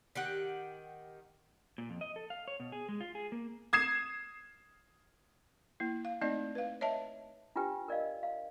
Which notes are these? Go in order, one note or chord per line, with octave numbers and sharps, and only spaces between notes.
D#3 G4 F#5
A#2
F2
D#5
A4
F5
C#5
B2
G#4
G#3
F4
G#4
A#3
D#6 G#6 C7 E7
A#3 E4
F5
A3 C4 D#4 D5 D#5
B4 F5
C#5 D#5 E5 A5
D4 F4 G4 B4 G5
A#4 D5 D#5 F5
F5